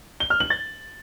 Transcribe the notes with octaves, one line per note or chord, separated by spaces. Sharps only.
G7
F6
F#7
A6